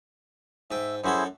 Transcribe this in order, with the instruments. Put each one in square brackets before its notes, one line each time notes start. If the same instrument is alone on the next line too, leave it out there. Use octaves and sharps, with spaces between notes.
[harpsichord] G#2 G5 [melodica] E5
[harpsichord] F#2 F#4 A4 [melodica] E4 G#4 C5